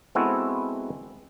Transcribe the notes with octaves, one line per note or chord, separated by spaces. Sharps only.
G#3 B3 C4 E4 F#4 A4